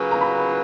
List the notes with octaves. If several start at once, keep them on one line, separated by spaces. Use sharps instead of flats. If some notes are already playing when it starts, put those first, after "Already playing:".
Already playing: C#3 F#3 A#3 F4 B4
A#5
B5